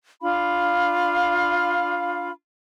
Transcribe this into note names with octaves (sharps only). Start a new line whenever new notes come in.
D4 F4 F5 B5